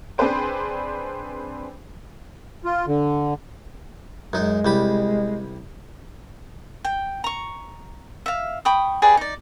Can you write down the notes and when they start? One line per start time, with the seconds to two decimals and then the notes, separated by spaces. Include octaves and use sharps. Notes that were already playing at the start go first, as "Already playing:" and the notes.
0.18 C4 D4 G#4 B4 C5 G5
2.65 F4
2.87 D3
4.33 F#2 G#3 D#4
4.65 C2 G3 B5
6.85 G5
7.24 A#5 C#6
8.26 E5 F5
8.65 G5 B5 C#6 D#6
9.02 G4 G#4 B4 D5
9.17 D#4 D5